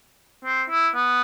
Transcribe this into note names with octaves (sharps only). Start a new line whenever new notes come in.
C4
E4
B3